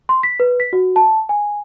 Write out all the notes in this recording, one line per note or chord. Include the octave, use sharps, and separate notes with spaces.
C6
B6
B4
B6
F#4
A5
G#5